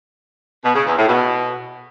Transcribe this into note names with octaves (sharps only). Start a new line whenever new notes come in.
B2
C#3
E2
A2
B2